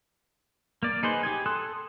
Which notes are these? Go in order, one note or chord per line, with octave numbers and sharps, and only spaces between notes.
A#3 D5
D#4 G#4 B4 C5
G4 G#4 G#5
A4 C6 D#6 F#6